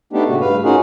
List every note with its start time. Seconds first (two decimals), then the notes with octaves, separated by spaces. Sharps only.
0.13 A3 B3 D4 D#4 G4
0.29 A#2 C#3 A3 F#4
0.41 G2 B4 F5
0.64 C#4 D#4 F4 F#4 G#4 A#4